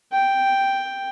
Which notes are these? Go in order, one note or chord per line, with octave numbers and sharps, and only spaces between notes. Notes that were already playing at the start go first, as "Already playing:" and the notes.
G5